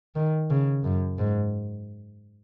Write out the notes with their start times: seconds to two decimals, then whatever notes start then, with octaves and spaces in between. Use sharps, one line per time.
0.15 D#3
0.50 C#3
0.84 F#2
1.19 G#2